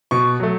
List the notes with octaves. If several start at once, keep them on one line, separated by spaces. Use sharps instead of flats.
B2 C#6
F#3 A3